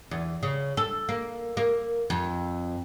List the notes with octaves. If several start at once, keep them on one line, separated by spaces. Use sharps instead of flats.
E2
C#3
A4
A#3
A#3
F2